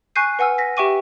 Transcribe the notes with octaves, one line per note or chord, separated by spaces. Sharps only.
G#5 C#6 F#6 G6 C7 D#7
B4 F#5 G#5 E6 F6
A#6 B6
G4 E5 G5 C#6 D6 D#7